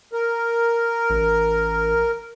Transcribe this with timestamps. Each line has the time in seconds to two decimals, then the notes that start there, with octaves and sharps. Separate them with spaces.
0.13 A#4
1.10 A1